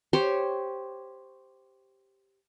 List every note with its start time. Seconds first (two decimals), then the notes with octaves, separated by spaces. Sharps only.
0.13 G4 C5 C#5 C6